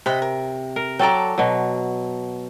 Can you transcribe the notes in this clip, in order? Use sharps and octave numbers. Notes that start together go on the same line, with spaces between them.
C3 D#5 F#5 B5
A#4
A#4
F#3 A4 D5 G5 A5 A#5
B2 F#3